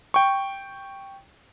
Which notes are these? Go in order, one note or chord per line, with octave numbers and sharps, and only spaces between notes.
G5 C#6